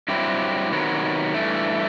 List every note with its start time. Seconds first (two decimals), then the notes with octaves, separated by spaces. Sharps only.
0.08 G2 F#3 C4 E4 G4
0.72 C3 D#3 F#3 B3
1.34 G2 E3 A3